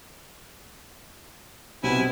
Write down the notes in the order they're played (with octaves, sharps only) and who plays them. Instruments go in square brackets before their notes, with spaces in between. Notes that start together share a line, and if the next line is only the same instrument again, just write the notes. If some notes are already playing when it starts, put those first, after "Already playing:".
[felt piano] B1 B3 [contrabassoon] C3 [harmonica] E4 G#5